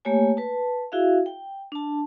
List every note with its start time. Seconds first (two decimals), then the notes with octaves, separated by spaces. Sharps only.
0.05 A3 A#3 G4 C#5 G#5
0.37 B4 A5
0.92 E4 F#4 G#4 E5 F5
1.26 G5
1.72 D4 A5